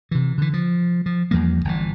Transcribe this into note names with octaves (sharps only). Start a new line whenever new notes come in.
C3 E3
D3 E3
F3
F3
E2 F3 G3 A#3
G1 E3